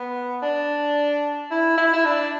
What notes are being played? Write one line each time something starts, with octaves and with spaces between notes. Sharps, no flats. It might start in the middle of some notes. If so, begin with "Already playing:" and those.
Already playing: B3
D4
E4
E4
E4
D4